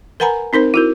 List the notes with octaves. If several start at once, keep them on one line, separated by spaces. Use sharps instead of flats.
A#4 B4 F#5 G#5 A#5 B5
C4 D#4 A#4 C5
E4 F#4 A#4